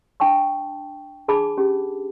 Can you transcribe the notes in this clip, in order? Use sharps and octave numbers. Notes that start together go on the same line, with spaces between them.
D4 G5 A5 C#6
D4 G#4 A5 B5 D6
C#4 G4